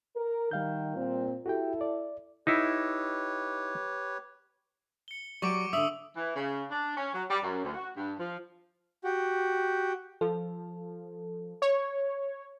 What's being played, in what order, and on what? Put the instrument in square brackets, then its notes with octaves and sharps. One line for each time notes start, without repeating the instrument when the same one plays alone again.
[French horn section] A#4
[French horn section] D#3 [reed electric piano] G3 F5 G6
[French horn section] A#2 C4
[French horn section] E4 A4 [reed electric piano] F#4 G4 G5
[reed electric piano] D5
[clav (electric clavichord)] D#4 E4 [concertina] G4 B4 C#5
[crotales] C#7 G7
[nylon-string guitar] F#3 G4 D5 [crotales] C#6 D6 D7
[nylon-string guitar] D3 D4 E5 [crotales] D#6 E6 F#7
[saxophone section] E3
C#3
D4
C#4
F#3
G3
F#2
D2
F#4
G2
F3
[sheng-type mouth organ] F#4 G4
[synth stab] F3 [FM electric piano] A4
[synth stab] C#5